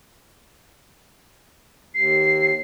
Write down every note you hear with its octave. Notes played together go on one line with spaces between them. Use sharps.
D#2 C7